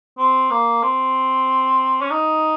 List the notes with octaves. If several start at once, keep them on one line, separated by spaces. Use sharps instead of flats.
C4
A#3
C4
C#4
D#4